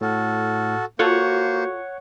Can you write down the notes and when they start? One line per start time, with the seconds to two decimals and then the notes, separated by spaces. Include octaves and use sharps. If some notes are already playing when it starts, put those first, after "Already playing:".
0.01 A2 F#4 A4 F6
0.99 A#3 F4 F#4 A4 C5 C#5 F#5 C#6